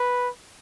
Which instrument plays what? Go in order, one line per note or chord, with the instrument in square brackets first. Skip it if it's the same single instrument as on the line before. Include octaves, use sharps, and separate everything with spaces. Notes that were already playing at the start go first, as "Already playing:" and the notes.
Already playing: [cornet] B4